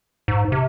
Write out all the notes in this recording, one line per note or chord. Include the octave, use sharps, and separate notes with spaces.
G#2
C3